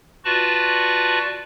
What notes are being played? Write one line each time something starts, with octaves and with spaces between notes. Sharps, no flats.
F4 F#4 B4 D5 A5 C#6